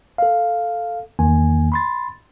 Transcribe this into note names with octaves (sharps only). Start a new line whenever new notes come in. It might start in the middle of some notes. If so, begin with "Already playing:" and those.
A4 F5
E2 D#3 A#3 G#5
B5 C6 A6